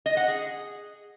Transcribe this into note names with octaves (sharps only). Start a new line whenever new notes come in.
D#5
F#5
G#4